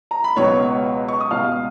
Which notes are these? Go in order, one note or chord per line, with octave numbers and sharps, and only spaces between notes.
A#5
B5
C#2 B2 F#3 B3 C#5 C#6
C#6
D#6
C#2 B2 G#3 F5 F6